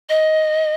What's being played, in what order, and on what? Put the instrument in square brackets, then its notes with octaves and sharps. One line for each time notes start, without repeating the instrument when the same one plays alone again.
[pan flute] D#5